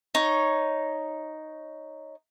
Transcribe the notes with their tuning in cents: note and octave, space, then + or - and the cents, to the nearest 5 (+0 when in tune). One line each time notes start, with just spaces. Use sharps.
D#4 +0 C#5 +0